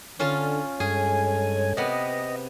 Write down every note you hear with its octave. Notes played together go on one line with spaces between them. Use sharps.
D3 C#4 F4 A5
G2 G#3 G#4 A4 C#5 G#5
C3 B3 D#5